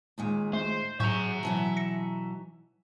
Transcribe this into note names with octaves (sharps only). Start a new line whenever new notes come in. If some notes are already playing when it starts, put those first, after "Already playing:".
D#2 A#2 G#3
A3 C5
A2 F#3 F#4 G#4 E5 A#5 C#6 G6
B2 E3 F#3
A#6 C#7